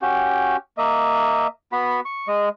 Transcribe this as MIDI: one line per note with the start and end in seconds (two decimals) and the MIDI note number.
0.02 0.57 61
0.02 0.57 66
0.02 0.57 67
0.78 1.47 58
0.78 1.47 75
0.78 1.47 76
1.72 2.00 59
1.72 2.00 66
1.72 2.00 83
2.05 2.28 85
2.28 2.49 56
2.28 2.49 75